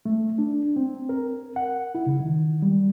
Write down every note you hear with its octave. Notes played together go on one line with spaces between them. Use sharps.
A3
D4
C4
A#4
F#5
E4
C#3
D#3
G3